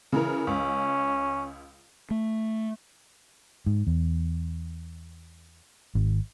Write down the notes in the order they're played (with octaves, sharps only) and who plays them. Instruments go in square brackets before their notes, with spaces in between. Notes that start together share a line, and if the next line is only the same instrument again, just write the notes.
[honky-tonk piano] C#3 E3 A#4
[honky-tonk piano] C#2 [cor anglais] C#4
[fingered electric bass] A3
G#2
E2
G#1